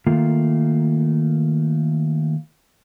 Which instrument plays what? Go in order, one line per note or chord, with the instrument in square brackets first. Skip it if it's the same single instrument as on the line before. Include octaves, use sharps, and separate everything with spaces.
[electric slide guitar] D#3 A3 A#3 F4